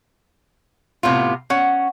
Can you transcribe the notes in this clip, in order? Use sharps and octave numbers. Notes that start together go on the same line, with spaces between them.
A2 C3 B3 F4
C#4 F#5